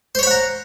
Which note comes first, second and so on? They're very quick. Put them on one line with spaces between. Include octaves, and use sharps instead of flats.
C5 C#5 B5 F#5 A#5